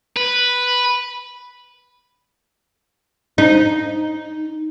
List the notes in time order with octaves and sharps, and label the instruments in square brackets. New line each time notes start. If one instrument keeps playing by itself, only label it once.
[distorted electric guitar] B4
[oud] D#4